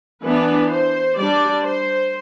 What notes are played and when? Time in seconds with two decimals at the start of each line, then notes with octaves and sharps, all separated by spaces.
0.24 E3 B3 D4 B4
0.71 C5
1.18 G3 D4 D5
1.67 C5